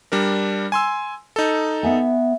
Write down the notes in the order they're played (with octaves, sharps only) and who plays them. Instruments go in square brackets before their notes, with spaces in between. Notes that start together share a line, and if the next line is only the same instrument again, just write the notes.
[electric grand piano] G3 D4 A#4
G#5 C6 E6
D#4 A4
[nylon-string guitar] B3 E5 G#5